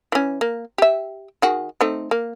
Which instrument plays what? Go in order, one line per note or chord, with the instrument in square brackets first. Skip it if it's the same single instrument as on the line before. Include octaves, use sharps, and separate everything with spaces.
[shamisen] E3 C#4
A#3
G4 E5
D#3 F#4 G#4
A3 C4 D#4
A#3